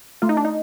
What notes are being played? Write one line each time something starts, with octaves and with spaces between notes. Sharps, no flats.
A3 F4
D#4
D4
D#4